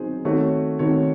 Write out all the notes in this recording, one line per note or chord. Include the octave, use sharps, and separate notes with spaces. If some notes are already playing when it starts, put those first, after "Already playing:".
Already playing: F#3 C4 D#4 G#4 C5
D#3 A3 C4 F#4 C#5
D#3 A3 C4 F#4 C#5